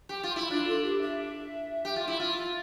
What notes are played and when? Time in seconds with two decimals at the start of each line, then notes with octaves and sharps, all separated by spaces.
0.09 G4
0.23 F4
0.36 E4
0.49 D4 F4
0.67 A4
0.83 G4
1.01 E5
1.85 G4
1.96 F4
2.08 E4
2.20 F4